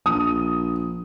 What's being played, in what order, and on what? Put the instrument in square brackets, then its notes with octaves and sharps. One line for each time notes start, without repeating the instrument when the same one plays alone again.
[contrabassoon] A#1 [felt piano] D#6